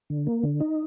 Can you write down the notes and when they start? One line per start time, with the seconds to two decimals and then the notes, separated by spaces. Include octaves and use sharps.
0.10 D3
0.27 A#3
0.43 D3
0.60 D#4